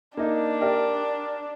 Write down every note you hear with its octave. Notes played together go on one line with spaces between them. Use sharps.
A#3 D4 D#4
G4 A#4 D5